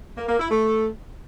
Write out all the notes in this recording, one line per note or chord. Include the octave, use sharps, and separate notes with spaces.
A#3
A#3
E4
A3